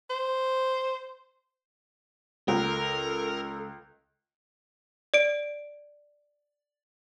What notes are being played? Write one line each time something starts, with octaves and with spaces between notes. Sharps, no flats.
C5
C#2 A4 A#4
D5 D7